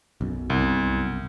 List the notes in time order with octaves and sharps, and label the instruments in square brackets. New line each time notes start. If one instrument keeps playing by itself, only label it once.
[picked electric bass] B1 F#2
[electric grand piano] C2